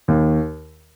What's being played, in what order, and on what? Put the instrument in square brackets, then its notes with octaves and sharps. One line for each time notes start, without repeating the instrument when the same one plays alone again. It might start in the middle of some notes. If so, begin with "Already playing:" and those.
[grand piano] D#2